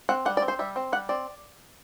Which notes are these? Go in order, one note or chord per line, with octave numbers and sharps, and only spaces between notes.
C4 F#5
G3 F#5
D5
C4
C5
G3 E5
C4
G3 F#5
C4 D5